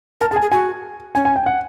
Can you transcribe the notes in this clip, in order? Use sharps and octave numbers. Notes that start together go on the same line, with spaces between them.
A#4 A5
G#4 A5
G#5
G#4
F#4 G#5
C#4 G#5
G#5
G5
F#5